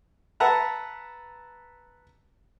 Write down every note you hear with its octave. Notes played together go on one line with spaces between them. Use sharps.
B4 E5 F#5 A5 A#5